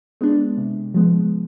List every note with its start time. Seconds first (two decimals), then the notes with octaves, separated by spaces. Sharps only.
0.21 G#3 B3 D4
0.58 C3
0.94 F3 G#3 B3